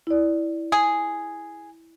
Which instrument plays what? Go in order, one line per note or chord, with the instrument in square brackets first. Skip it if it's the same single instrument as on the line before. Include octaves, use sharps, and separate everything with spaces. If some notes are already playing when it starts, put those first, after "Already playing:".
[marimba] E4 D5
[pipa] G#4